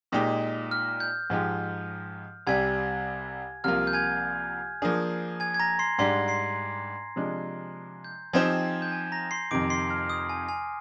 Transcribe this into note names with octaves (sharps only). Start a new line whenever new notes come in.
A#2 G#3 D#4 G4 D#6
F6
G6
G#2 F3 G#3 D#4 G4
C2 C3 G3 G#5 G#6
C2 C3 F3 A#3 F4 F6
G6
G#5 G#6
F3 A#3 D4 G#4
G#5 G#6
G#6
A#5 A#6
C6 C7
G#2 G3 D4 C6 C7
C6 C7
C3 F3 G#3 D4
G6
F3 C4 D#4 G4 C5 G#5 G#6
G6
G#5 G#6
A#5 A#6
C6 C7
F2 C3 D#3 D6 D7
C6 C7
F6
D#6
G#5
G#5